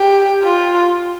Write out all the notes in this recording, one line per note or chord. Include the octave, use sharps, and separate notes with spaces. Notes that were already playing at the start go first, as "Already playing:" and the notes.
Already playing: G4
F4